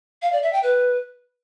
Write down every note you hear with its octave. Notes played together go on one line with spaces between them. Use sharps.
F5
D5
E5
G5
B4